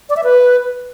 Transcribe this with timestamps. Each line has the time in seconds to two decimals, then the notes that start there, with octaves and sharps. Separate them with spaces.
0.09 D5
0.17 E5
0.24 B4